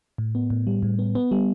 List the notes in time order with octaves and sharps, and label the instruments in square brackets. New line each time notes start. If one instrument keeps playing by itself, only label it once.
[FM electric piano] A2
B3
A2
G3
A2
B3
B3
G3